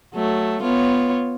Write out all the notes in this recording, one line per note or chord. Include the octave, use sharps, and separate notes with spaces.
F#3 A3
B3 F4 C#5